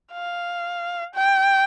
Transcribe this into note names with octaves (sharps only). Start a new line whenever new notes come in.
F5
G5